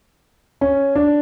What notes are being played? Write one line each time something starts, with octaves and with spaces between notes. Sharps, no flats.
C#4
D4